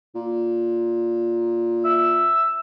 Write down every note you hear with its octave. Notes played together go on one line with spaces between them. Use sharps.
A#2
E5